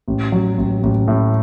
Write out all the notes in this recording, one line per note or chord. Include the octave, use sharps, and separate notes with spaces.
A1
F#3
A1
A1
A2